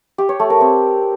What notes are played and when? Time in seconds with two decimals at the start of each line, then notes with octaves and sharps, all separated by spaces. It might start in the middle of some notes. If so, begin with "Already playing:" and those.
0.18 G4
0.29 C#5
0.40 A3
0.50 A#4
0.61 C4